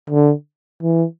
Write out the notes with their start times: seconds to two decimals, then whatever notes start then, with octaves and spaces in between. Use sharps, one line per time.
0.10 D3
0.82 E3